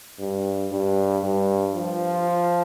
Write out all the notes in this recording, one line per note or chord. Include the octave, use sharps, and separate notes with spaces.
G2
G2
G2
F3